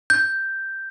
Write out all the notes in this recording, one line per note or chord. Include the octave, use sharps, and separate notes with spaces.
G6